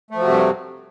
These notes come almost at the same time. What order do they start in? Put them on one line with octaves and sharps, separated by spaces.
A3 F3 F#3 C3 G2